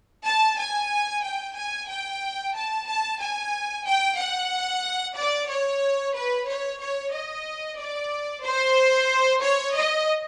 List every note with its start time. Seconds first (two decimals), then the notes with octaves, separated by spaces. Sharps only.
0.25 A5
0.59 G#5
1.24 G5
1.56 G#5
1.88 G5
2.54 A5
2.87 A5
3.20 G#5
3.86 G5
4.18 F#5
5.16 D5
5.48 C#5
6.15 B4
6.47 C#5
6.80 C#5
7.12 D#5
7.79 D5
8.44 C5
9.41 C#5
9.74 D#5